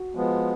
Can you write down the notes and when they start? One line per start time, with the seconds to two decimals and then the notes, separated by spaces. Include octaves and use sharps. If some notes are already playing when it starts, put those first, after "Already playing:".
Already playing: F#4
0.15 F3 G#3 B3